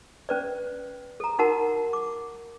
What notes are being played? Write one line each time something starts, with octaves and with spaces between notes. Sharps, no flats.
C#4 B4 D5
A4 A#5
D#4 F#4 A#4 F#5 A5
D6